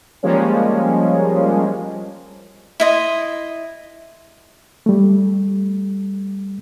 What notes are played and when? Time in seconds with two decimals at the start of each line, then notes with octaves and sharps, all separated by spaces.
0.23 F3 G3 G#3 A#3 C#4
2.80 E4 D#5 C6
4.86 G3 A3